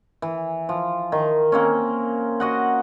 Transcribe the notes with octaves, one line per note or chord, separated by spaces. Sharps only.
E3
F3
D#3
A#3 C4 C#4
F#4 D#5 F#5